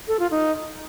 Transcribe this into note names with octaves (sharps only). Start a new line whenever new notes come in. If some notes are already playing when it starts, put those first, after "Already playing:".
A4
F4
D#4